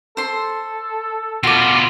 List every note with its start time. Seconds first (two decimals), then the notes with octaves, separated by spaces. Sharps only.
0.17 A4 C5 C6
1.43 B2 F4 F#4 D6